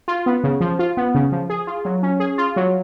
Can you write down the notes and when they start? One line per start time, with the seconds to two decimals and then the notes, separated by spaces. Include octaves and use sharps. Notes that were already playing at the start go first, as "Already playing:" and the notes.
0.08 F4
0.26 B3
0.44 C#3
0.61 F3
0.79 F4
0.97 B3
1.15 C#3
1.32 F3
1.50 G#4
1.67 F4
1.85 F#3
2.03 C#4
2.20 G#4
2.38 F4
2.56 F#3